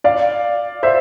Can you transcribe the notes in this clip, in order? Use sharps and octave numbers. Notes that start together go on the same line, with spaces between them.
D5 F5
C5 E5